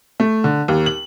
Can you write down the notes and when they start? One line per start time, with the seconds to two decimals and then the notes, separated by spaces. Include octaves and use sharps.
0.20 A3
0.44 D3
0.68 D#2
0.86 F#7